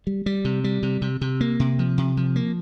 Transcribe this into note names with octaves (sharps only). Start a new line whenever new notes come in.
G3
G3
C3
G3
C3
C3
C3
A#3
C3
F3
C3
F3
A#3